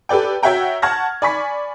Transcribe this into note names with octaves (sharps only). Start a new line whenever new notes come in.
G4 A4 B4 D5 G5
F#4 C#5 E5 F#5 G5 A#5
F#5 A5 C#6 F6 G#6 A#6
D5 G#5 B5 C#6 B6